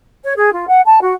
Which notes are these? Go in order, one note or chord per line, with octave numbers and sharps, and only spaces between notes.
C#5
G#4
F4
F#5
A5
F#4